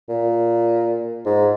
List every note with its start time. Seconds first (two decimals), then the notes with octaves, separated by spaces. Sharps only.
0.09 A#2
1.26 G#2